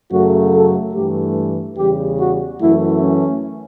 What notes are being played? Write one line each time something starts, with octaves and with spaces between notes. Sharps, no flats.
F#2 C#3 F#3 A3 F#4
A4
G2 E3 A3 G4
E2 C#3 G3 G4
F#4
F#2 E3 A3 E4
C#4